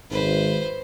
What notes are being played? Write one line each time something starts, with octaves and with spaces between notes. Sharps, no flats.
G#1 B4 C5